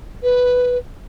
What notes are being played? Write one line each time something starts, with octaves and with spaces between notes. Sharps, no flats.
B4